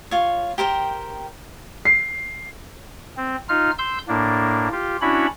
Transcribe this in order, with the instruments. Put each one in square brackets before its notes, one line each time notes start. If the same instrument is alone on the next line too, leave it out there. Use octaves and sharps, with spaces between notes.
[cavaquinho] F4 C#5
G4 A#4 C5 G5
[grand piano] C7
[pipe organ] C4
D#4 F4 F6
C6 E6 G6
A2 A#3 D4
F4 G4
C#4 D4 E4 F#4 C#5 B5